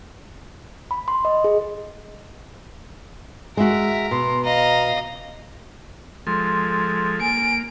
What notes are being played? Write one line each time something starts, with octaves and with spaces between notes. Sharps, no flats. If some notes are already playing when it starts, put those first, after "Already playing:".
B5
C6
D#5
G#4
G#3 F#4 A#4 E5
B2 C6
D#5 F5 A#5
F3 G#3 A4 C6
A#3 G#5 D7